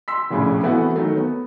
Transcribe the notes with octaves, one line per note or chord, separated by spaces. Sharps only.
C6 E6 B6
F1 A#1 A2 C#3
E3 A3 B3 C4 E4 F#4
D#3 F#3 A3
B3